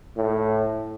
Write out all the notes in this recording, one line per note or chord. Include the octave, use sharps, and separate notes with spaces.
A2